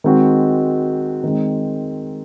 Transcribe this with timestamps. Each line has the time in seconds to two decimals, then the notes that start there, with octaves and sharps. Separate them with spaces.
0.04 D#3 G#3 C4 F#4
1.24 D#3 G#3 C4